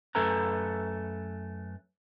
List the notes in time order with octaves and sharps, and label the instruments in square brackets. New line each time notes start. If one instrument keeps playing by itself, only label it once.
[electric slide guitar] F#2 A3 C#4 A4 B4 A#5